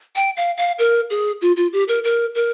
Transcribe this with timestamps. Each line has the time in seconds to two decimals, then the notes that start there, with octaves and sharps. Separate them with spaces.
0.16 G5
0.37 F5
0.57 F5
0.79 A#4
1.10 G#4
1.42 F4
1.57 F4
1.73 G4
1.88 A#4
2.04 A#4
2.35 A#4